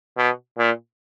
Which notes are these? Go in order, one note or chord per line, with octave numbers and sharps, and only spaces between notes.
B2
A#2